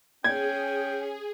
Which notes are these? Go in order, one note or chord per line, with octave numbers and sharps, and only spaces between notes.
C#4 G#4 G5 G#6